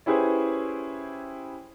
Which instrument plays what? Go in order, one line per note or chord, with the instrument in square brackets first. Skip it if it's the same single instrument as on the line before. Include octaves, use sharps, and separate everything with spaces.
[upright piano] C#4 E4 G4 G#4 B4 C5